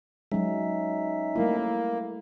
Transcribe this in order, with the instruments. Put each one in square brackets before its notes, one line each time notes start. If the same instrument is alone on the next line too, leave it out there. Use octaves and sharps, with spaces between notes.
[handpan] F#3 G#3 [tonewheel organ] C#4 D#4 E5
[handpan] G3 A3 E4 [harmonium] A#3